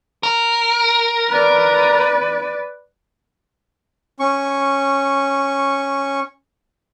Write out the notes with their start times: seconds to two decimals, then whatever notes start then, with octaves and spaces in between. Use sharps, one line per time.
0.23 A#4
1.29 B4 D5
4.20 C#4 C#6